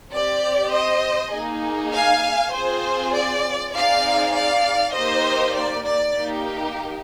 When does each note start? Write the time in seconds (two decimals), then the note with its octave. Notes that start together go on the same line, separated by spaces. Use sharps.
0.12 C4 G4 D5
0.71 C5 D#5
1.32 A#3 D#4 G#4
1.93 F5 G#5
2.53 C4 F4 G#4 C5
3.14 D5
3.74 C4 D#4 G#4 D5 F5
4.34 D5 F5
4.94 A#3 D#4 G4 C5 D#5
5.55 D5
5.85 D5
6.15 A#3 D#4 G4